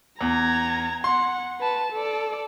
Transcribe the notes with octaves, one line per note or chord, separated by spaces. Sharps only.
E2 A#5 G#6
F#5 C6
B4 A5
A4 D5